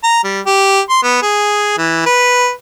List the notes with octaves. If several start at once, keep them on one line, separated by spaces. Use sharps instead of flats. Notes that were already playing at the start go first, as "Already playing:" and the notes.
A#5
G3
G4
C6
B3
G#4
E3
B4